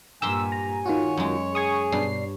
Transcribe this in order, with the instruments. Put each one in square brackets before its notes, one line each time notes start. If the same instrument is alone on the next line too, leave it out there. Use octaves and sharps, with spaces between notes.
[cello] G2 A#2 [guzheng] G4 A#4 C6 [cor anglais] G#5 [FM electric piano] E6
[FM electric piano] A#5
[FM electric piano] D#3 F4 F#4 [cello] C#5
[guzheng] F#2 G#3
[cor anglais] G#4 [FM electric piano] G#5 C#6 D#6
[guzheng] G2 [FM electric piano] B2 D4 C7